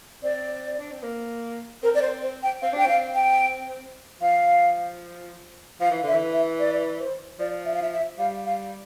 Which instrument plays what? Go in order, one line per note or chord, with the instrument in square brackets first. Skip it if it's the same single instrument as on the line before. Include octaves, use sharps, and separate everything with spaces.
[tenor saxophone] C4 [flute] D5
[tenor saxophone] D4
C4
A#3
[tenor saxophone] C4 [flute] A#4
[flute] D5
C5
C5
G5
[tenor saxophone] C4 [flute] F5
[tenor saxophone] D4 [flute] G5
[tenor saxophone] C4 [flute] F5
[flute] G5
[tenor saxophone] F3 [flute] F5
[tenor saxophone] F3 [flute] F5
[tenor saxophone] E3
[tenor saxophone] D3 [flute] E5
[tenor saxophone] E3
[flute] E5
D5
C5
[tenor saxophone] F3 [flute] D5
[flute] E5
F5
E5
E5
[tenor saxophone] G3 [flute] F5
[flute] F5